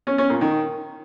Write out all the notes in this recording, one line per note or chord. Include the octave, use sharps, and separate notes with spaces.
C#4
C#4
A#2
D#3